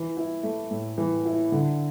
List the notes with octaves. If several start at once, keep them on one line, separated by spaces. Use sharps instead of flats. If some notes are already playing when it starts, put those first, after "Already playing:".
Already playing: E3
E4
A3
A2
E3
E4
D3